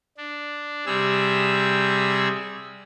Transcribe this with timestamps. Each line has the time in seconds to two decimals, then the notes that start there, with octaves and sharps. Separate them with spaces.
0.18 D4
0.86 C3 G3 G#4 E6